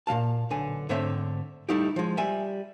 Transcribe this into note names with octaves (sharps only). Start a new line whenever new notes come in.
A#2 C#3 F5 A5
B1 D3 G#5
G#2 D3 A3 C4 C#5 E5
G3 A3 D#4 E4 G4
F3 G#3
G3 E5 G#5